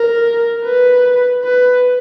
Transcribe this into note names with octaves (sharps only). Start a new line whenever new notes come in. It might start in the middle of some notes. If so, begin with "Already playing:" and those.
Already playing: A#4
B4
B4